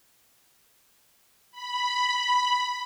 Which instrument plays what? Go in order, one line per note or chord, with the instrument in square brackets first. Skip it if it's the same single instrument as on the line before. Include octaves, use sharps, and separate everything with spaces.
[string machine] B5